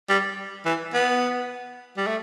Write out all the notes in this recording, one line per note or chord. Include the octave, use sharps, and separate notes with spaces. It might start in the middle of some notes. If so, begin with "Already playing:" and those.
G3
E3
B3
G3
A3